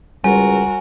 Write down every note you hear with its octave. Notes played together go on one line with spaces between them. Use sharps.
C#2 G3 F#4 A#4 G#5